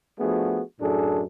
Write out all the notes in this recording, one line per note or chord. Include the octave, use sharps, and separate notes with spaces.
F3 A3 B3 D4 F#4 G#4
F#2 A2 D4 G#4 A4